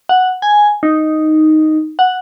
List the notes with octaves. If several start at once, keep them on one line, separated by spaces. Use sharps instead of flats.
F#5
G#5
D#4
F#5